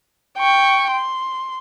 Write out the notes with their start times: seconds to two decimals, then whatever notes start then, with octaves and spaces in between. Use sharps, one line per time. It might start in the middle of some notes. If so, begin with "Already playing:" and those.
0.38 G5 C#6
0.91 C6